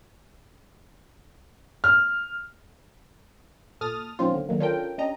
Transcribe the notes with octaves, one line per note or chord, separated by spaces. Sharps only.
F6
A#2 A4 D#6 F6 A6
B2 D#3 F#3 C4 C#4 F4
D3
D3 D#3 F#3 A#3
C#4 D4 F4 A4 A#4 G5
C#4 D4 G4 D#5 A#5